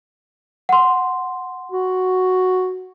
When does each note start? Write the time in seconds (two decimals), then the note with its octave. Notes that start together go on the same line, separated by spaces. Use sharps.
0.69 F#5 C6
1.72 F#4